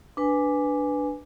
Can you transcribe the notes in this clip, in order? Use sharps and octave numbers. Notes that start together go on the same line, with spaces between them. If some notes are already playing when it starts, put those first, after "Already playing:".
D4 B4 G#5